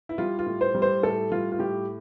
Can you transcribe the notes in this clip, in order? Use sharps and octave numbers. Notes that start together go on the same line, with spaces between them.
E4
G3 F4
F4
A2
C5
G3
C5
A2 A4
G3 F4
F4
A2 G4